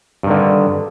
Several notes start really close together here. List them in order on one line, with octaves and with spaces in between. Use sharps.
G2 D#3 D3